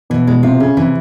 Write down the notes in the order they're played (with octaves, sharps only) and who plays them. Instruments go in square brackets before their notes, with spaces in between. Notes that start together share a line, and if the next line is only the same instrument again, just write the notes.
[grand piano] B2 [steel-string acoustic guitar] E3
[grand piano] B2 [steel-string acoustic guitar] G#3
[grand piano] C3 [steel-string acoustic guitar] F4
[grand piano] C#3 [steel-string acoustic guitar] C#4
[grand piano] C3 [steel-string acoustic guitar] E3